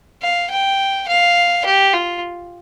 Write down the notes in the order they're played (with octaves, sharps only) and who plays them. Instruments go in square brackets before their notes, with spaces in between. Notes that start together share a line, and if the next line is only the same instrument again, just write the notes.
[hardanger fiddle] F5
G5
F5
G4
F4